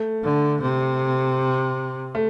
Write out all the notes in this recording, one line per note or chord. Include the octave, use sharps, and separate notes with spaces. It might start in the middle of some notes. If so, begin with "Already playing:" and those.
Already playing: A3
D3
C3
A3